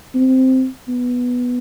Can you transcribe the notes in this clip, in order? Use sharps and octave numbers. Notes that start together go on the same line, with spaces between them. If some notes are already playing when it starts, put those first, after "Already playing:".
C4
B3